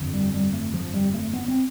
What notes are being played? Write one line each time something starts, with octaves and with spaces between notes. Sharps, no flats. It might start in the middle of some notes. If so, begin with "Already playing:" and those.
Already playing: G1 F2 D3
G3
G3
A3
F3
G3
A3
B3
C4